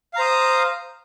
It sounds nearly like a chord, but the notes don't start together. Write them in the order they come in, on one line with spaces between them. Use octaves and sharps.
F5 A#5 C5 D#6